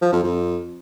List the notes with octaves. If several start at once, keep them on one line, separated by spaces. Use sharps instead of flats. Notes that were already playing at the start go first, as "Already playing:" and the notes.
F3
F2
F2